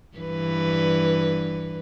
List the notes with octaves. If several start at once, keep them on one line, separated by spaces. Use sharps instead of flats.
G2 E3 B4